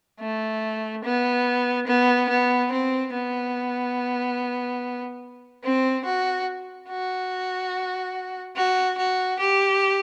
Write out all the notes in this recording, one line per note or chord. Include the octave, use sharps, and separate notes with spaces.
A3
B3
B3
B3
C4
B3
C4
F#4
F#4
F#4
F#4
G4